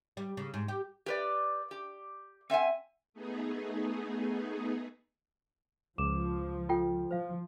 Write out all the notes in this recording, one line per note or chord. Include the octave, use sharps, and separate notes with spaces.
G3
C#3
G#2
G4
G4 B4 D5
G4
C4 E5 F#5 G#5
A3 B3 D#4 G#4
C#2 F3 D6 E7
F4 A4 G5
F3 C5 F5